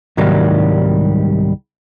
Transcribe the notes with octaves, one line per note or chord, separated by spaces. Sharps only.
C2 G#2 D#3 F#3 G3 A#3